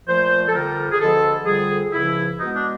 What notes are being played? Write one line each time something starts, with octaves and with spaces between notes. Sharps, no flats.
A#2 F3 A3 C5
A4
F2 D3 G3 A#4
G#4
D2 D3 F3 G#3 B3 A4
F2 D3 G3 G#4
C#2 C#3 F3 E4
B2 G#3 B3 D#4
D4